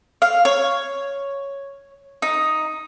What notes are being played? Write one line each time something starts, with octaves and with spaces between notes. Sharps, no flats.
F5
C#5
D#4